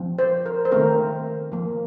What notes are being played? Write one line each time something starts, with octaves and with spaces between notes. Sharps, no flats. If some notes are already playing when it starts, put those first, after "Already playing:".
Already playing: F3 C4
C5
A#4
C5
D#3 A3 C4 A#4
F3 A#3